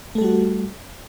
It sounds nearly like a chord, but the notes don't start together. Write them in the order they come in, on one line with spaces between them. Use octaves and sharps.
A3 A4 G3 F#4